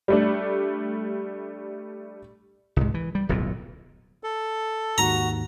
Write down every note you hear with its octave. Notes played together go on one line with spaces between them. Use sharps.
G3 A3 D4
C2 G#2
E3
G3
D1 B1 F2 A#2
A4
D#2 G#2 F#4 A#5